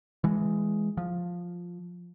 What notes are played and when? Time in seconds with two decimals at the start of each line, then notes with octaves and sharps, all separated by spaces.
0.24 E3 G#3
0.97 F3